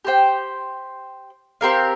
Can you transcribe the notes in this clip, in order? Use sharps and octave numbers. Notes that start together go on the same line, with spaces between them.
G4 C5 G5
C4 G4 A#4 F5